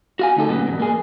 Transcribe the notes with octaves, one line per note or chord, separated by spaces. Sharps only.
F#4 F5 G#5
D2 D#4 A4
D2 G2 A#2 F#3 B3 C#4
E2 G#2 B2
A#3 G#4